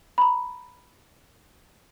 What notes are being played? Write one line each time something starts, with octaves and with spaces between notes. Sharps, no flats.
A#5 B5